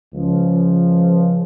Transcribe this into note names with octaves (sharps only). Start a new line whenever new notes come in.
C#2 C#3 F3